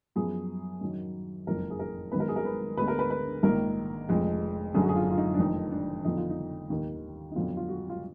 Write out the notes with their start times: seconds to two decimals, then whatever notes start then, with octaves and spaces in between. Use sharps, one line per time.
0.15 F#2 F3 B3 G#4
0.81 F#2 D#3 F#3
1.47 F#1 F2 F3 A#4
1.70 G#4
1.79 A#4
2.12 G#1 G#2 D#3 F#3 B3 B4
2.20 A#4
2.28 G#4
2.36 A#4
2.45 B4
2.77 D2 D3 G#3 B3 B4
2.88 A#4
2.99 B4
3.10 B4
3.43 A#1 G#2 D#3 A#3 A#4
4.09 F1 F2 F3 G#3
4.74 F#1 F#2 D3 G#4
4.82 F#4
4.89 G#4
4.96 F4
5.10 F4
5.18 D#4
5.34 D4
5.39 F1 F2 D#3 D#4
5.72 D4
6.04 F2 D3 F3 B3 D#4
6.17 F4
6.30 D#4
6.70 D#2 D#3 A#3
7.31 D#4
7.35 F2 D3 F#3 B3 F4
7.57 F4
7.68 F#4
7.90 F4